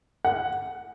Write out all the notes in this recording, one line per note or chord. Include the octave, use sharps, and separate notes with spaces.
F#5